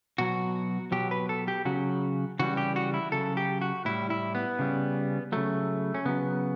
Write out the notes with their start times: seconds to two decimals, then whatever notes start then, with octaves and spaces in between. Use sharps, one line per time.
0.18 B2 F#3 F#4
0.92 B2 F#3 G4
1.11 B4
1.29 A4
1.48 G4
1.65 C#3 F#3 F#4
2.39 C#3 E3 G3 F#4
2.57 G4
2.76 F#4
2.94 E4
3.12 C#3 F#3 A4
3.37 G4
3.61 F#4
3.85 A2 G3 E4
4.10 E4
4.35 B3
4.59 C#3 G3
5.32 C#3 F#3 A3
5.95 C#4
6.05 C#3 F#3 B3